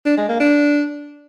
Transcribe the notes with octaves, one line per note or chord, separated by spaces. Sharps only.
D4
G#3
A#3
D4